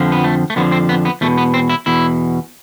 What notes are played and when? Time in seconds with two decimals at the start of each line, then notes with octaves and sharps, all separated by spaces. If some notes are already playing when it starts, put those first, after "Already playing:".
Already playing: F2 D3 F3
0.12 B3
0.24 A3
0.50 A3
0.56 F2 D3 F3 B3
0.72 C4
0.89 B3
1.05 B3
1.21 E2 B2 A3
1.38 B3
1.54 C4
1.70 E4
1.86 E2 B2 E4